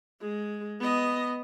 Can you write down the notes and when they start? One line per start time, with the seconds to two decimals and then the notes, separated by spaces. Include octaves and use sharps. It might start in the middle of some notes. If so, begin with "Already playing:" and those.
0.21 G#3
0.80 B3 D#5